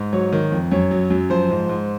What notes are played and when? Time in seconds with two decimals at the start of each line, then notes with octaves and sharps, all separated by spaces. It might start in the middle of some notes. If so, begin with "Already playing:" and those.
Already playing: G#2
0.13 F#3 C#5
0.33 D#3
0.52 F2
0.71 F#2 C#5
0.91 F#3
1.10 F#2
1.30 F3 C5
1.51 G#2
1.69 G#2